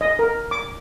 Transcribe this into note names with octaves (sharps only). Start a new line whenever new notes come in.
D#5
A#4
D6